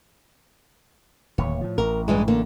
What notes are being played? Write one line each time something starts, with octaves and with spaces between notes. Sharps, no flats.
D1 D#2 C#5
A2 F3
A1 A#4
G2 E3 G#3
D3 A#3